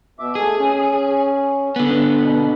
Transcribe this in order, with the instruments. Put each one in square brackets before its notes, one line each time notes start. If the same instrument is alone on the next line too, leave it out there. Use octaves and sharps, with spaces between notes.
[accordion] B2 E5 D6
[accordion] A3 G#5 [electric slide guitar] G#4
[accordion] C#4
[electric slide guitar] D3 B3
[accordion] B2